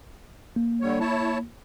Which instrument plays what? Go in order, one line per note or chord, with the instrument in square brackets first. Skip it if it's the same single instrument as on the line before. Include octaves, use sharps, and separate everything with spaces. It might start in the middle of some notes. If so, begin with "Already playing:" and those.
[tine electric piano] A#3
[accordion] D3 G3 C#5
E4 C#5 A5